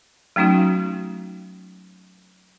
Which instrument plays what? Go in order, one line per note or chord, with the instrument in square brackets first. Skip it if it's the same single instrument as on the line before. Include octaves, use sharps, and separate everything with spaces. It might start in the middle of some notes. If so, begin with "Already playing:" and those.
[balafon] F#3 A3 C#4 D#4 F#4